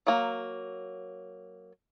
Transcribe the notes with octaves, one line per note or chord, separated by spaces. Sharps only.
F#3 A#3